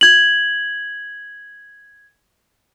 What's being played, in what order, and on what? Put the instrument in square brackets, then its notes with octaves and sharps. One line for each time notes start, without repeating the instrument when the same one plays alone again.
[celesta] G#6 F#7